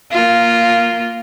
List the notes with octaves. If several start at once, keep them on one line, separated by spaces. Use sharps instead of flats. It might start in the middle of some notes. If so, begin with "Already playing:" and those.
A#3 F4